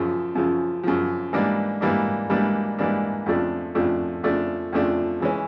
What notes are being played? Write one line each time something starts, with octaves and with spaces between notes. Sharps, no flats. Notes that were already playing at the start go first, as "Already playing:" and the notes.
Already playing: F#2 C#3 F3
F#2 C#3 F3
F#2 C#3 F3
G#2 E3 G3 A#3 D4
G#2 E3 G3 A#3 D4
G#2 E3 G3 A#3 D4
G#2 E3 G3 A#3 D4
F2 C#3 F3 A3 D4
F2 C#3 F3 A3 D4
F2 C#3 F3 A3 D4
F2 C#3 F3 A3 D4
C#3 E3 G#3 C#4